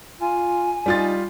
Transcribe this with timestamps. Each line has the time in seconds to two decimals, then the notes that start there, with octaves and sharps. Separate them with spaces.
0.21 F4 G#5
0.86 G3 D#4 F4 A6